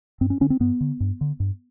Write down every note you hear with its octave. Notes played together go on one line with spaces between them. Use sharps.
G2 C4
C#4
D3 C#4
C4
G2 B3
D3
G2
D3
G2